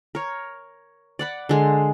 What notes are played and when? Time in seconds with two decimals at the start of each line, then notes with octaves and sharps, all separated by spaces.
0.15 A#4 C#5
1.19 D5 F#5 B5
1.49 D3 G#3 C6